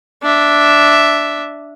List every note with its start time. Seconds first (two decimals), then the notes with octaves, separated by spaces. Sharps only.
0.23 D4 E5